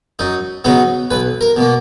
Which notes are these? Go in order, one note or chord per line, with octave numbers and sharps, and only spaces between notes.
F#2 D#4
C#3 F#3 B3 D#4
B1 B4
A#4
B2 A#3